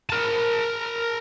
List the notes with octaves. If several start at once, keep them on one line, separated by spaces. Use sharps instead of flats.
A#4 A5